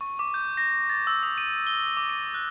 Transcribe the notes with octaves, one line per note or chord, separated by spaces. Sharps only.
C#6
D6
G6
A#6
A6
E6
D#6
D#7
G7
D6
D#7
F#6